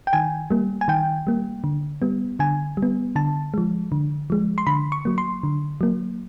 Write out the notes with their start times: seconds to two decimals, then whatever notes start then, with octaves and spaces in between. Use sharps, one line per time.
0.07 G5
0.13 D#3 G#5
0.51 G3 A#3
0.81 G#5
0.88 D#3 G5
1.27 G3 A#3
1.64 D3
2.02 G3 B3
2.39 D3 G#5
2.77 G3
2.83 B3
3.16 D3 A5
3.54 F3 G#3
3.92 D3
4.30 F3 G#3
4.58 C6
4.67 D3 B5
4.92 C#6
5.05 F#3 A#3
5.18 C6
5.43 D3
5.81 F#3 A#3